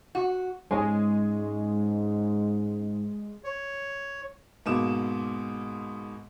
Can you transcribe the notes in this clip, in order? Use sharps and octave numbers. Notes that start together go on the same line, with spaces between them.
F#4
G#2 G#3 C#4 C#5 G#5
C#5
G#2 B2 A#3 D6 E7